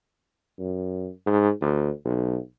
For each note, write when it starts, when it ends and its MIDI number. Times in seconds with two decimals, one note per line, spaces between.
0.59 1.09 42
1.26 1.50 44
1.62 1.90 38
2.05 2.38 35